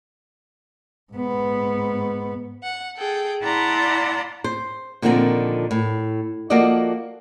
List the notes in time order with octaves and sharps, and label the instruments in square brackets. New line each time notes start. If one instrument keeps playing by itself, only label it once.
[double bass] G#2 B3
[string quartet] F#5
G#4 A4 G5
E4 D5 F#5 A5 A#5 C6
[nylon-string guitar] C5
A#2 D3 D#3 F3 C4 A#4
A2
F3 A#3 F#4 A4 D5 D#5